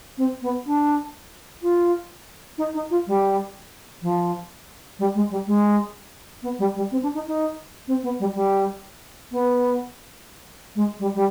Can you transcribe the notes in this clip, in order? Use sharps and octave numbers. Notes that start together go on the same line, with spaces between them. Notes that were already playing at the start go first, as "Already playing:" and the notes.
C4
B3
D4
F4
D#4
D#4
F4
G3
F3
G3
G#3
G3
G#3
B3
G3
G3
C4
D4
D#4
D#4
C4
B3
G3
G3
B3
G#3
G3
G3